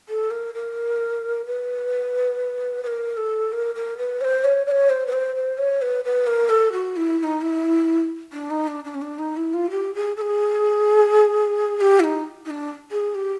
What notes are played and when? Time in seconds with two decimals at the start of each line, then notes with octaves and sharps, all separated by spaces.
0.09 A4
0.30 A#4
0.54 A#4
1.46 B4
2.83 B4
2.87 A#4
3.17 A4
3.52 A#4
3.75 A#4
3.97 B4
4.21 C#5
4.24 C5
4.44 C#5
4.66 D5
4.71 C#5
4.89 C5
5.06 B4
5.12 C5
5.35 C5
5.58 C#5
5.82 B4
6.04 B4
6.27 A#4
6.49 A4
6.72 F#4
6.96 E4
7.19 E4
7.23 D#4
7.41 E4
8.32 D4
8.50 D#4
8.67 D4
8.84 D4
8.94 C#4
9.01 D4
9.18 D#4
9.36 E4
9.54 F4
9.70 G4
9.94 G#4
10.16 A4
10.21 G#4
11.76 G#4
11.81 G4
12.00 E4
12.04 D#4
12.45 D#4
12.50 D4
12.91 G#4
13.15 G4